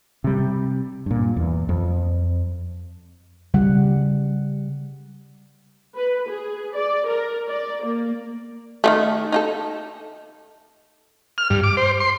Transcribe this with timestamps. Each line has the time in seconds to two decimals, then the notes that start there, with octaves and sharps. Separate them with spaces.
0.24 C3 G3
1.06 G2 A#2
1.36 E2
1.69 F2
3.54 C#3 G3 F#5
5.97 B4
6.29 G#4
6.75 D5
7.08 A#4
7.49 D5
7.84 A#3
8.84 D#3 F#3 A3
9.32 D#4 F4 A4
11.38 F6
11.50 G2
11.64 D6
11.77 C5
12.00 C6